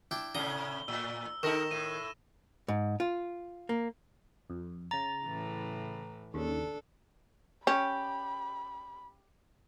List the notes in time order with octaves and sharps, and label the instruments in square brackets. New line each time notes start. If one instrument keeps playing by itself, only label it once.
[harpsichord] D4 E4 G5
[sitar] A2 C3 [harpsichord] A#5 D#6 [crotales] G7
[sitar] A2 [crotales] E6
[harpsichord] D#3 [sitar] D#4 A4 A#4 [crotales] E6 A#6 E7
[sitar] A2 [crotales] D#7 E7
[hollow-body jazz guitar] G#2
F4
A#3
[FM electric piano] F2
[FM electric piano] C#3 A6 [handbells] A#5
[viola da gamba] A2 E3
[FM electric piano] D#2 C#3 [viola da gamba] D4 A4
[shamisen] C#4 [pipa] G4 [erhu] B5